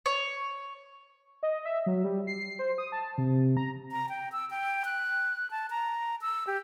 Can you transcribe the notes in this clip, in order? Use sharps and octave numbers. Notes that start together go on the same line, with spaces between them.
C#5
D#5
E5
F#3
G3
C7
C5
D#6
A5
C3
A#5
A#5
G5
E6
G5
F#6
A5
A#5
E6
G4